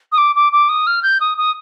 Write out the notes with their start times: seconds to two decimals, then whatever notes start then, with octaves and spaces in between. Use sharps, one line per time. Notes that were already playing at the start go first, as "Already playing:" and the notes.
0.12 D#6
0.18 D6
0.36 D6
0.53 D6
0.69 D#6
0.87 F6
1.03 G6
1.21 D#6
1.38 D#6